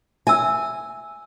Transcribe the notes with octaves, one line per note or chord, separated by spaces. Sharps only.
E5 G#5 E6